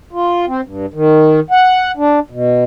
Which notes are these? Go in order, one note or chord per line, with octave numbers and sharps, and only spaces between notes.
F4
C4
G2
D#3
F#5
D4
B2